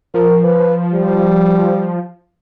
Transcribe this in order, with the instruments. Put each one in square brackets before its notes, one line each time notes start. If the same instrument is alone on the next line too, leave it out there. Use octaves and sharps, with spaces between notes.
[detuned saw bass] F3 [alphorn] A#4
[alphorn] B4
G3